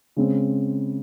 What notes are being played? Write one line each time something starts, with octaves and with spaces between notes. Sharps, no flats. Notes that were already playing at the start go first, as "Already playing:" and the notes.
C#3 G#3 C4